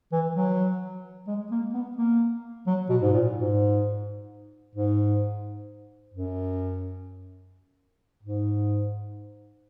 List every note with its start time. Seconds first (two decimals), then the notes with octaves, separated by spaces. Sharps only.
0.12 E3
0.35 F#3
1.27 G#3
1.51 A#3
1.74 B3
1.97 A#3
2.67 F#3
2.89 B2
3.02 G#2
3.13 A#2
3.36 G#2
4.75 G#2
6.14 F#2
8.23 G#2